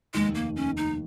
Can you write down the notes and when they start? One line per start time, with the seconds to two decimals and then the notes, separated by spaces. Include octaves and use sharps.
0.14 F1 D#2 D#3 G#3
0.35 A#3
0.56 C#4
0.77 D#4